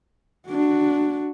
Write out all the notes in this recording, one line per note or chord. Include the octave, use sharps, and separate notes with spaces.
D4 F#4